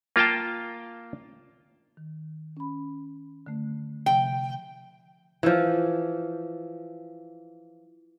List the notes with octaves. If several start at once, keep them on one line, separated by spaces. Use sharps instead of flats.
A#3 F4 F5 G5 A5
D#3
C#4 B5
D3 A3
C3 F3 E5 G5
E3 F3